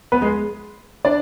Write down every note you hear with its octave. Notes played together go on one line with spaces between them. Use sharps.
B3 B4
G#3 G#4
D4 D5